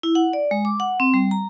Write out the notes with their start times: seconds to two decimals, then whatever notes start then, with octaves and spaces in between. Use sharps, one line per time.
0.03 E4
0.15 F#5
0.33 D5
0.51 G#3
0.65 D6
0.80 F#5
1.00 C4
1.14 G3
1.31 A#5